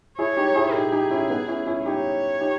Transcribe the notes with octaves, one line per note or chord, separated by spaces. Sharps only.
E4 G#4 C#5
D#4 G4
E4 G#4
D#4 G4 G#4
D#4 G4
C#4 E4
B3 D#4
C#4 E4
C#4 E4
D#4 G4 C#5
D#4 G4